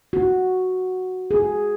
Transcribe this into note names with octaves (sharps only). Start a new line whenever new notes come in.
F#4
G#4